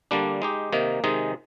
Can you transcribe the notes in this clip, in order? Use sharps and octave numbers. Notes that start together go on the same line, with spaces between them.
D3 G3 A#3 D4
G#3 D#4 G4
C3 D#3 A#3 D#4
C3 D#3 G#3 D#4 G#4